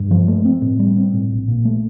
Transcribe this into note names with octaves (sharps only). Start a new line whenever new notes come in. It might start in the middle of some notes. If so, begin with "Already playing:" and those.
Already playing: G2
F3
A3
C4
A2
G3
C4
A2
A#1
A#2
A3